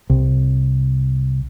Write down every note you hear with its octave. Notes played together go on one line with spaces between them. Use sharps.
C2